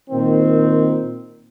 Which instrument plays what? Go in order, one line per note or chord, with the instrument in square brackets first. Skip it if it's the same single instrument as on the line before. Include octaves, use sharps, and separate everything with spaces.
[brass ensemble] A#2 D#3 C4